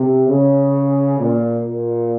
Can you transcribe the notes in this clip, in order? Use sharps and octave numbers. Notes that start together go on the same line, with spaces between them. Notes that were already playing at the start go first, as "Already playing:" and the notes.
Already playing: C3
C#3
A#2
A#2